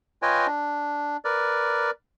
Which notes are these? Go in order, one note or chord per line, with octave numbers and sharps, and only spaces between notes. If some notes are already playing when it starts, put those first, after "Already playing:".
F4 B4 C#5 D#5 G5 G#5
D4
A#4 B4 D5